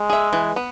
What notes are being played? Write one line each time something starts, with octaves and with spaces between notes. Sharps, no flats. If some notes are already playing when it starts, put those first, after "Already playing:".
Already playing: G#3
G#4 E5
E3
B3